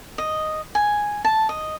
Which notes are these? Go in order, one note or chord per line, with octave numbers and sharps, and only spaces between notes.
D#5
G#5
A5
D#5